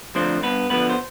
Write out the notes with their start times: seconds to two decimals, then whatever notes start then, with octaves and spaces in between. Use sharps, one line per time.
0.15 D3 F3 A3 C4 C5
0.43 G2 B3 B4
0.70 D3 F3 A3 B3 B4
0.90 C5